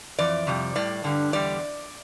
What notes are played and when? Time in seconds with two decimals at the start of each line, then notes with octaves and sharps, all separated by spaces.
0.19 F2 E3 D5
0.47 F2 C3 G3
0.75 A2 G3 D5
1.04 G2 D3 G3
1.33 E2 D3 G3 D5